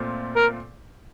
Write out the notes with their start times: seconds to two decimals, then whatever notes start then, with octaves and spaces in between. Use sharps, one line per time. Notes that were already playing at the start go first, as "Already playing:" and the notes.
Already playing: A#2 A3 C4 F4
0.36 A#4